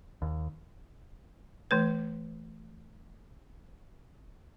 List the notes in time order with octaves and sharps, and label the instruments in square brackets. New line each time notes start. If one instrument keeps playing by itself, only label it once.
[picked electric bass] D#2
[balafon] E3 A3 B4